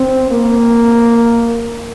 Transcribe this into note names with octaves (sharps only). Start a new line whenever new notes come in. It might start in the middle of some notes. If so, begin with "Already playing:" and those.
Already playing: C4
A#3